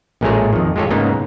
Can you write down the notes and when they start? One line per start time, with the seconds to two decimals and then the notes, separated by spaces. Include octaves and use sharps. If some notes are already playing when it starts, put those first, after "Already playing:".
0.21 A1 A#2 G#3 A3 G#4 C#5
0.53 F2 D#3
0.76 G#3 F4 G4 A4 C#5
0.90 G#2 C#3 A#3 B3 D#4